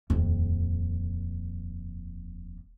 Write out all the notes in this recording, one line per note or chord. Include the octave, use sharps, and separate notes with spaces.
D#1 F2